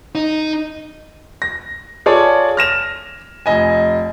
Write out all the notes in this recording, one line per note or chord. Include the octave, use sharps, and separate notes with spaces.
D#4
A#6
F4 G#4 A4 C#5 D5 A5
F6 A#6 E7 F7
F1 D#5 G#5